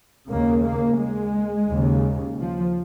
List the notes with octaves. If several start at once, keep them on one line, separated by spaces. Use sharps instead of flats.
D#2 C#3 A#3
A#3
G#3
D#2 C#3
F3